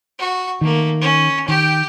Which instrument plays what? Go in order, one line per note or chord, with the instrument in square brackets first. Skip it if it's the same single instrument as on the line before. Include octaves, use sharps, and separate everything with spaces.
[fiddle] F#4
[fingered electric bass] D#3 [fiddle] A3 A#3
[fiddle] C#4
[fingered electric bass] D#3 [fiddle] G4 G5